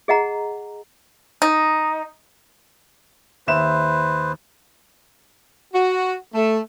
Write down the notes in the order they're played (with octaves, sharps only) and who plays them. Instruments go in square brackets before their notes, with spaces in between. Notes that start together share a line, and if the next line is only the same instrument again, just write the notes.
[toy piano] G#4 D#5 F#5 A#5
[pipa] D#4
[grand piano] D#2 E5 E7 [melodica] B4 C5
[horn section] F#4
A3